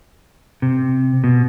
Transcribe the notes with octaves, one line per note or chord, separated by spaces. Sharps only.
C3
B2